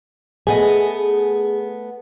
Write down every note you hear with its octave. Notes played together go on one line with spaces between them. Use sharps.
A3 B3 G#4 D#5